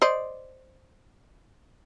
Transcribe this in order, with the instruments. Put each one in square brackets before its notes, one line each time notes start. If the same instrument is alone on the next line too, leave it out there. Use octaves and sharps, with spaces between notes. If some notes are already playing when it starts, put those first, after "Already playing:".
[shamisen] C5 D5 D#5